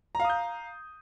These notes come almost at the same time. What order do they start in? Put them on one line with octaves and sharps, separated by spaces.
A#5 F5 D#6 G6